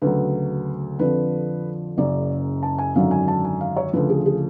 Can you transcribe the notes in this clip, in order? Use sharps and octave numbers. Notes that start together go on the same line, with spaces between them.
D2 C#3 F#3 B4
F2 D3 F3 B4
F#1 F#2 C#3 D5
A5
G#5
G#1 F#2 D3 F#3 F5
G#5
A5
G#5
F5
C#5
D2 C#3 F3 B4
G#4
G#4